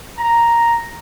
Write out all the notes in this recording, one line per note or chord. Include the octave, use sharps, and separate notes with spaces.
A#5